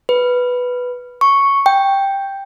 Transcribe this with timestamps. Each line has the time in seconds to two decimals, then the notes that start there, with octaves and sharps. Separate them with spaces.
0.09 B4
1.21 C#6
1.66 G5